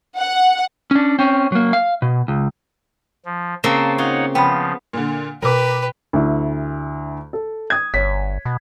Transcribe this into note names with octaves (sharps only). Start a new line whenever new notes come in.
F#5
C#4 D4
C4 C#4
F#3 A#3
F5
B2
C#2
F3
C#3 A#3 C4 A5
D#4 F4 C#5 F#5
C#3 F3 B3 G5 B5
A#2 D3
B2 F4 G4 A#4 B4 D6
D2 E4
A4
D#6 G#6
G1 C#5 B6
B2